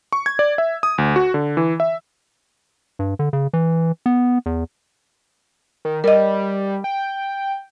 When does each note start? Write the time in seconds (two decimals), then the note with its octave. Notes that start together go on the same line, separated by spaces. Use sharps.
0.13 C#6
0.26 G#6
0.39 D5
0.58 E5
0.83 D#6
0.98 D2
1.16 F#4
1.34 D3
1.57 E3
1.80 E5
2.99 G2
3.19 D3
3.33 C#3
3.54 E3
4.06 B3
4.46 E2
5.85 D#3
6.04 G3 A#4 D#5
6.84 G5